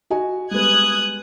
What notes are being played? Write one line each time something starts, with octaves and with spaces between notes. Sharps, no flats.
F#4 D#5 G#5
G3 G#3 B3 D#6 F#6 G#6